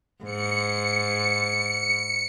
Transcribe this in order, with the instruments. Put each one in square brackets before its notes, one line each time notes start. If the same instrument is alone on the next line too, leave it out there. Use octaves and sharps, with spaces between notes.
[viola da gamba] G#2 [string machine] C#7